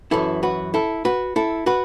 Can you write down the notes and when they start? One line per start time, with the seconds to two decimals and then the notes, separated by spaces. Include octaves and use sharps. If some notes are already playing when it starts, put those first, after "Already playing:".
0.11 F#2 E3 E4 A4
0.43 F#4 B4
0.74 E4 A4
1.05 F#4 B4
1.36 E4 A4
1.66 F#4 B4